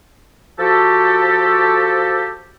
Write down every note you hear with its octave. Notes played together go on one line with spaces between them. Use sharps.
F3 F#4 G4 A4